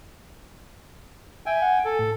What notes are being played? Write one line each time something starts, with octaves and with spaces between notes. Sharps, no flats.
E5 G5 G#5
F#5
A4 G#5
A2